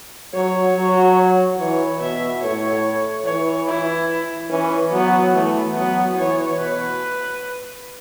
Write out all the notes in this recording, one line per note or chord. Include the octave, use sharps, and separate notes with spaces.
F#3 C#5
F#3
E3 C#5
B2 E5
A2 C#5
E3 C#5
E4
E3 C#4
F#3 B3
E3 A3
F#3 B3
E3 C#5
B2 B4